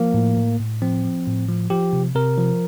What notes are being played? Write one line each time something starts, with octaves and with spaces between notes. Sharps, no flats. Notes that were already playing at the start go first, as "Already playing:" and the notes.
Already playing: F3 A#3
A2
A2
A2
F3 C4
F3
A2
F3
F3 G4
C3
C3 A#4
F3